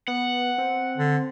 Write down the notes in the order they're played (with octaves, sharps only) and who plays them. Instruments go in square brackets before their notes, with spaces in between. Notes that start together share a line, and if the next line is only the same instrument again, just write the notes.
[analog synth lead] B3 [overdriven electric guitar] F#5
[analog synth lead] C4
[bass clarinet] D3